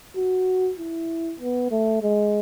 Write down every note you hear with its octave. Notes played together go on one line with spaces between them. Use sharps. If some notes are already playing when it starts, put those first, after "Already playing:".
F#4
E4
B3
A3
G#3